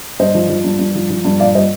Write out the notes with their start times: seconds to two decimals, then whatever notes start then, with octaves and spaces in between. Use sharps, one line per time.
0.19 G2 C5 D#5
0.34 F3
0.49 F3
0.64 G2
0.79 G2
0.95 F3
1.10 F3
1.25 G2
1.40 A#2 D5 F5
1.55 G3 C5 D#5